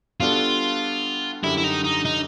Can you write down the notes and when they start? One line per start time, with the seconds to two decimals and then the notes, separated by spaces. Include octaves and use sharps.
0.20 G3 B3 D4 F4 F#4 A4
1.43 F#2 D3 G3 E4
1.57 E4
1.64 D#4
1.84 D#4
2.05 D#4